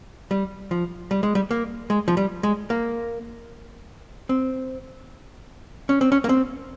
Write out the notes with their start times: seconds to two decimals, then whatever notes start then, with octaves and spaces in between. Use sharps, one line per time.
0.31 G3
0.71 F3
1.11 G3
1.23 G#3
1.35 G3
1.51 A#3
1.90 G#3
2.08 F3
2.17 G3
2.43 G#3
2.70 A#3
4.29 C4
5.89 C#4
6.01 C4
6.12 C#4
6.24 A#3
6.29 C4